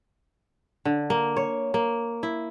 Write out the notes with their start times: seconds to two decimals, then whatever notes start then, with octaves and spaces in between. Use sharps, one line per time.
0.85 D3
1.10 A#3
1.37 C#5
1.74 A#3
2.23 E4